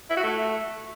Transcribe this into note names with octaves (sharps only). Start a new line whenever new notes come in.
E4
F#4
A3